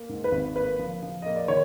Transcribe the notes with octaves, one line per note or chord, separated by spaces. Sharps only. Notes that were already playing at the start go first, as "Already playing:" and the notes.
Already playing: A#3
G#2
B4
G#1
A#3 B4
F3
F3
A#3 D#5
D5
D#3 C#5